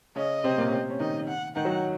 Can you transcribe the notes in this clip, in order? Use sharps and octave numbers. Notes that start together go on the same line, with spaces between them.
C#3 C#4 D#5
C3 C4
A#2 A#3
C#4
C3 C4
C#4
D#3 D#4 D#5
F#5
D#3 D#4 F#5
F#3 F#4